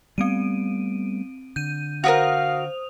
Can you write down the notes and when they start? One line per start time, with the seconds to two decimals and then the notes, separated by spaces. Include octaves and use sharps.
0.18 G3 A3 B3 C4 D7 D#7
1.56 D3 G6 D#7
2.04 F#4 G4 A#4 C5 F5 D#6 F7